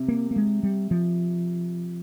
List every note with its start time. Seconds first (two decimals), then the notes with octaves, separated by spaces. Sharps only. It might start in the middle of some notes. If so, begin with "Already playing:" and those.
Already playing: C3
0.08 A#3
0.31 A#3
0.36 G#3
0.63 G3
0.91 F3